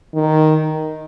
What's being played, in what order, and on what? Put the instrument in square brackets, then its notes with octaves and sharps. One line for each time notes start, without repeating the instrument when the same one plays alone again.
[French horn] D#3